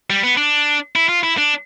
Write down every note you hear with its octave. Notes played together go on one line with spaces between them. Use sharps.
G3
B3
D4
E4
F4
E4
D4